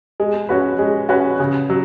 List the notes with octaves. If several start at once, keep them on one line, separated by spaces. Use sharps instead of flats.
G#3
C#4 F#4 B4
G#3
C#4 F#4 B4
C#3
F#3